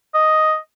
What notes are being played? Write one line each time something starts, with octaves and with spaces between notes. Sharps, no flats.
D#5